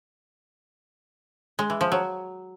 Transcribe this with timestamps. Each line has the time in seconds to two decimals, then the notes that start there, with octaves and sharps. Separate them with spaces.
1.59 G#3
1.70 E3
1.81 F3
1.92 F#3